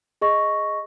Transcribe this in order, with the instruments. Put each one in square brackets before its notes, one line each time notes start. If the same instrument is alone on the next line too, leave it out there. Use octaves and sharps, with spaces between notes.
[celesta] G#4 D#5 C#6 A#6